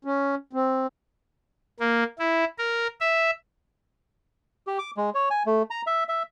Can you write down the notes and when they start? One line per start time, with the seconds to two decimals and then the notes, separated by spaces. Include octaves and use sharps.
0.05 C#4
0.53 C4
1.80 A#3
2.19 E4
2.58 A#4
3.01 E5
4.67 G4
4.79 D6
4.97 G#3
5.14 C#5
5.30 G#5
5.46 A3
5.71 A#5
5.87 E5
6.09 E5